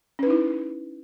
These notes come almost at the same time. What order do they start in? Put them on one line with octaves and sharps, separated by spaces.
C#4 B4 D#4 E4